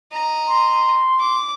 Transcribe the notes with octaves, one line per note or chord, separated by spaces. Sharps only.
D#5 A#5
C6
D6